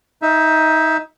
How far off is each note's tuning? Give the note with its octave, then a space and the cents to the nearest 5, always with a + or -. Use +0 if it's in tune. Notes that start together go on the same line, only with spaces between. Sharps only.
D#4 +20 E5 +0